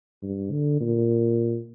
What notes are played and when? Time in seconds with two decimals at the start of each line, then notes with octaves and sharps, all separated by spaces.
0.23 G2
0.52 D3
0.81 A#2